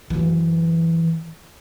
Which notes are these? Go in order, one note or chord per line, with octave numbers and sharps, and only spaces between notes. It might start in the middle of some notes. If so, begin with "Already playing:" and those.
F#2 E3